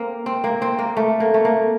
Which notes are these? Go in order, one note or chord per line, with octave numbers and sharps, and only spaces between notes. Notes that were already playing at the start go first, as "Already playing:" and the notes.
Already playing: A#3 C4
C4
A#3
C4
A#3
A3
A#3
A3
A#3